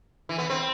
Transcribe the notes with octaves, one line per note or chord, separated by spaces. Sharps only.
E3
B3
C4